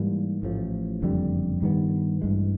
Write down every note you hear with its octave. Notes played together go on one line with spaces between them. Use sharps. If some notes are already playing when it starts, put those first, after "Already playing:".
Already playing: G#2 E3 G3 A#3
A1 A2 F3
F#1 F2 D3 G3
G2 D#3 G3 B3
A1 G2 E3 G#3